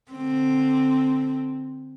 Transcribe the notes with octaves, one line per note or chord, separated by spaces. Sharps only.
D3 C4